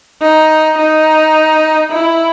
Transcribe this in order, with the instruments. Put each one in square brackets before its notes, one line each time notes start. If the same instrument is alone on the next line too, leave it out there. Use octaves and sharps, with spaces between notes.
[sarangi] D#4
D#4
E4